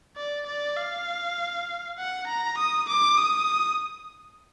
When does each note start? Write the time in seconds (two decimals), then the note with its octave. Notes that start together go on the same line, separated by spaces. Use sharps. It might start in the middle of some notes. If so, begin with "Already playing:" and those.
0.17 D5
0.47 D5
0.77 F5
1.99 F#5
2.28 A#5
2.58 D#6
2.89 D6
3.18 D#6